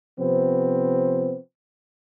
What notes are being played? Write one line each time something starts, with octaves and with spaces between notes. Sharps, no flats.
C3 F3 B3 C4